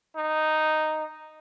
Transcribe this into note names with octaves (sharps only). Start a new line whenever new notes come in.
D#4